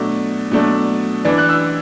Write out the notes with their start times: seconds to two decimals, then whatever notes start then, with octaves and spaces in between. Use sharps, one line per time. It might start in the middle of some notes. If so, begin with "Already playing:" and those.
Already playing: B2 F#3 A3 D4
0.51 B2 F#3 A3 D4
1.25 E3 D4
1.38 F#6
1.49 E6